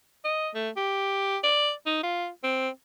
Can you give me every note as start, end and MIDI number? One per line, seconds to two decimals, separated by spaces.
0.24 0.50 75
0.54 0.69 57
0.77 1.37 67
1.43 1.72 74
1.86 2.00 63
2.03 2.28 65
2.43 2.69 60